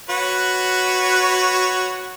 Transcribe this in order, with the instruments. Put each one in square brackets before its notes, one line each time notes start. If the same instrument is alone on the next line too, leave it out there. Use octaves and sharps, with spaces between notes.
[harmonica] F#4 B4 C#5